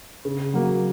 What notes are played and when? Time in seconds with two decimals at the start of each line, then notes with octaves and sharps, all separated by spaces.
0.25 C#3
0.54 F#3 A#3